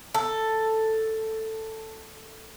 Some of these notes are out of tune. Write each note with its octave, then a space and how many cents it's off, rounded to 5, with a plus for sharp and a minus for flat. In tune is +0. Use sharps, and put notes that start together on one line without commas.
A4 +5